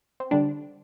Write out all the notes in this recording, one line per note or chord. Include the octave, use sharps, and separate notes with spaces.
C4
D3 G3 D4